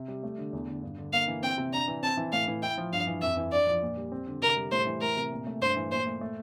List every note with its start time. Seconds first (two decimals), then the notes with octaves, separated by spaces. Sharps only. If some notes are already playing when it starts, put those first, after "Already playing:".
Already playing: C3
0.08 G3
0.23 A3
0.38 D3
0.53 E2
0.68 D3
0.83 G2
0.98 D3
1.13 A#3 F5
1.28 E3
1.43 C4 G5
1.58 C3
1.73 D4 A#5
1.88 E3
2.03 C4 A5
2.17 E3
2.32 A2 F5
2.48 E3
2.62 E4 G5
2.78 F3
2.93 G2 F5
3.07 E3
3.22 F2 E5
3.37 E3
3.52 D4 D5
3.67 F3
3.82 A#2
3.97 G3
4.12 C4
4.27 D3
4.42 C3 A#4
4.57 G3
4.71 A2 C5
4.87 E3
5.01 A3 A#4
5.17 C3
5.32 A#2
5.47 A3
5.61 G2 C5
5.76 E3
5.91 A#2 C5
6.07 A3
6.21 A3